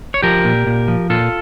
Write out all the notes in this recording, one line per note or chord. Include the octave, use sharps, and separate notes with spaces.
C#5
F3 G4 A#4
A#2
A#2
F3
A#2 F4 A4